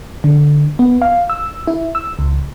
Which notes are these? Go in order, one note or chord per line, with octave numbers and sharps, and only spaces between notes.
D3
B3
F5
E6
E4
E6
C#2